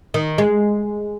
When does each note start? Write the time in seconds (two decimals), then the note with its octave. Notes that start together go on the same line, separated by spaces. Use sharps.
0.14 D#3
0.38 G#3